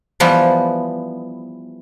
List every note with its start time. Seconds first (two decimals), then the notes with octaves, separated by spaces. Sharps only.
0.20 E3 F3 G3 B3